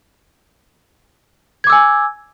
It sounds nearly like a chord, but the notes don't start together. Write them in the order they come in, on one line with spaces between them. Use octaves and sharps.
G#6 D6 E6 G#5